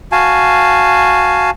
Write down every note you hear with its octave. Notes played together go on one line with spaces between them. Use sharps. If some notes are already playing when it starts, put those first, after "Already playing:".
F#4 F5 G#5 A5